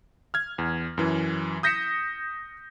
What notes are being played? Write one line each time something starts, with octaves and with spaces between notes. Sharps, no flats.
F6 G#6
E2
F#2 E3
D#6 G6 A#6 B6 C#7 E7